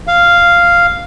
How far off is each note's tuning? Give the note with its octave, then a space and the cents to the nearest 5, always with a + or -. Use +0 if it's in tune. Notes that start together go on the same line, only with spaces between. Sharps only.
F5 -5